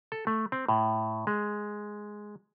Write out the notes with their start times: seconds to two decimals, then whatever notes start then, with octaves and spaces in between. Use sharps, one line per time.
0.12 A4
0.27 A3
0.52 C4
0.69 A2
1.27 G#3